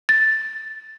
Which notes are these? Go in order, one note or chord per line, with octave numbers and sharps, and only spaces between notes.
A6